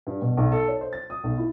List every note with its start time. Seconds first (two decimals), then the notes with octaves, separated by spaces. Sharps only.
0.07 G2
0.22 B2
0.37 B1
0.52 A4
0.68 C#5
0.81 C5
0.93 A6
1.10 D#6
1.24 B1
1.38 E4